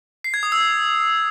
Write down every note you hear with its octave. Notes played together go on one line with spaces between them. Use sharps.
C7
G#6
D#6
E6